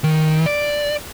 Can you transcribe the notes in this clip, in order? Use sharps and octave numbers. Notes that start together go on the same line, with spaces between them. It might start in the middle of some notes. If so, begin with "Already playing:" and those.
D#3
D5